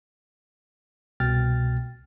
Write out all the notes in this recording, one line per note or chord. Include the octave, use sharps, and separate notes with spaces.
C2 B2 G5 F6 A6